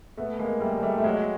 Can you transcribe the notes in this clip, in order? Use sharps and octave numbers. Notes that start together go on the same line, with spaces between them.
A3 B3
G#3 A#3
G3 A3
G#3
G3 A3
A3
F#3 G#3